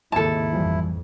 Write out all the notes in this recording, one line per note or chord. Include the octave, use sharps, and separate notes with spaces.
G#1 D#2 C#3 E4 A4 A5
A1 F2 E3 F3 G3